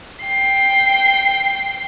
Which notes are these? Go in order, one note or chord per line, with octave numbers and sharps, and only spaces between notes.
G5 C7